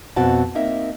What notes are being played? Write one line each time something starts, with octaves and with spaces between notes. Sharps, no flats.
F2 B2 C4 F#4 F#5 A5
A#3 C4 D#4 A#4 E5